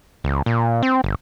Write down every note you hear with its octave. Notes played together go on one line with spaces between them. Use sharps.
C#2
A#2
C4
G1